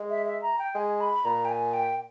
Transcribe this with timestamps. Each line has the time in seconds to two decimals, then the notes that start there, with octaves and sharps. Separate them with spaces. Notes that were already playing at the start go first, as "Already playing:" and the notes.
Already playing: G#3
0.10 E5
0.26 E5
0.42 A#5
0.59 G5
0.75 G#3 G#5
1.01 B5
1.25 A#2 A#5
1.45 G5
1.49 G#5
1.73 G5